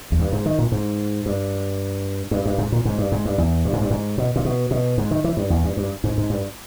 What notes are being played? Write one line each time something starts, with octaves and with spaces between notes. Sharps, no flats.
E2
G2
G#2
D#3
A#2
G#2
G2
G2
G2
G#2
A#2
G#2
G2
G#2
G2
E2
G2
G#2
G2
G#2
B2
A#2
B2
B2
G#2
D#3
E3
G2
E2
G2
G2
G#2
G#2
G2